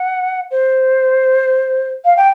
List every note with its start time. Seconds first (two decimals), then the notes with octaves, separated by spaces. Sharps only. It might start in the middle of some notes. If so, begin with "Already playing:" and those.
Already playing: F#5
0.51 C5
2.04 F5
2.17 G5